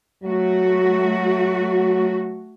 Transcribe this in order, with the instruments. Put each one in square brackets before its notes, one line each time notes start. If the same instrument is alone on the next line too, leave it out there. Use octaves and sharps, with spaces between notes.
[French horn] F#3 [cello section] A3 F#4